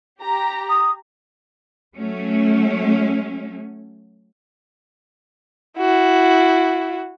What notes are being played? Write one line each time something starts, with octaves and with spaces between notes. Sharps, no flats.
G4 A#5
D#6
F#3 A3 C#4
E4 F#4